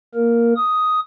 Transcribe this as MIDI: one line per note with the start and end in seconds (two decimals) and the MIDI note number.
0.15 0.53 58
0.15 0.53 70
0.56 1.00 87